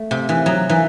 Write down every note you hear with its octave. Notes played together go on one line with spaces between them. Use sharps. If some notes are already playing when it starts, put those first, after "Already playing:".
Already playing: A3
C3
E3
F#3
E3